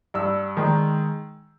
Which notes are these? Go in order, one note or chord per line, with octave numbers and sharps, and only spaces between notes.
G2 E6
D#3 G#3